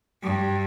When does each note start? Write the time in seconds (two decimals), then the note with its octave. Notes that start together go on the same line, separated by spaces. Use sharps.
0.23 G2